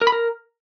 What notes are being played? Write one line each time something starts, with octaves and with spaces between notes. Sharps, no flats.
A#4
B5
A#4